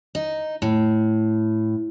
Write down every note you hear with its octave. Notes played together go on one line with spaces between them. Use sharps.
D#4
A2